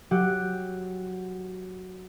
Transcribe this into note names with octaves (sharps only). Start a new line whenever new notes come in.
F#3 G4 F#5